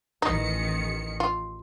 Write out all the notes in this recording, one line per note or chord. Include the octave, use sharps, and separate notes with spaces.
A1 D#3 D#4 C#7
F4